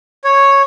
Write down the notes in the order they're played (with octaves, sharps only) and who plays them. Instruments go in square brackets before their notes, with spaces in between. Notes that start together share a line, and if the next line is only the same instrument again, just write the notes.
[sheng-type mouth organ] C#5